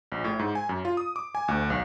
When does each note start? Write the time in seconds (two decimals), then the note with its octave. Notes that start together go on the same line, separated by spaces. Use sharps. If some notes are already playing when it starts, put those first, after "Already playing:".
0.12 A#1
0.24 A2
0.39 G#2
0.55 G#5
0.69 F#2
0.85 F4
0.97 D#6
1.16 D6
1.35 G#5
1.48 D2
1.70 B1